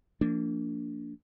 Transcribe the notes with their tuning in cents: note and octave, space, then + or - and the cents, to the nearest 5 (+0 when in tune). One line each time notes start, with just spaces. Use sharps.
F3 -35 A#3 -35 D4 -20